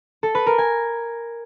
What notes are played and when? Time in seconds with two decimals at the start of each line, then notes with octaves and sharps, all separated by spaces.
0.23 A4
0.35 B4
0.47 A#4
0.58 G#5